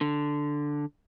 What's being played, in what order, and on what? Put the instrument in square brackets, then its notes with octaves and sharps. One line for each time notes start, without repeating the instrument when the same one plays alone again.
[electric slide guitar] D3